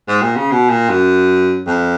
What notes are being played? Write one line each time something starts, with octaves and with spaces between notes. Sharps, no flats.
G#2
A#2
C#3
B2
A#2
F#2
F2